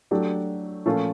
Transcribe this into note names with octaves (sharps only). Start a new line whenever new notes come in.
F#3 A3 D4 G4
A#2 F3 A3 C#4 F4